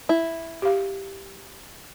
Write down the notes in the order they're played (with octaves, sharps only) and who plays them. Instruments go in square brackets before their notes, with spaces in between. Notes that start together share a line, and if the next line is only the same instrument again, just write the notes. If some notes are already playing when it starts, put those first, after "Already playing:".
[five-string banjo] E4
[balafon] G4 F5